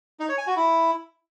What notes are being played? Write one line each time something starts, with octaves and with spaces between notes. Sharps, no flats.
D#4
C#5
G#5
F#4
E4